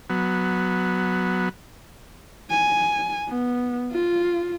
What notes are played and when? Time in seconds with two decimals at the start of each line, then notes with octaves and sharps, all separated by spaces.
0.10 F#3 B3
2.51 G#5
3.28 B3
3.92 F4